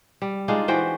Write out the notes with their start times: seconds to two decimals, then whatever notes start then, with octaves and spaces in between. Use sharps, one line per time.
0.22 G3
0.48 G#3 D4 D#4 F4
0.68 E3 F#4 C5 G5